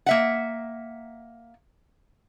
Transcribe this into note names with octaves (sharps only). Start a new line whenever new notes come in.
A#3 E5 F#5